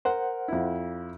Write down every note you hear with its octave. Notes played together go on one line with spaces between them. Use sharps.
A#4 C5 F#5
F2 E4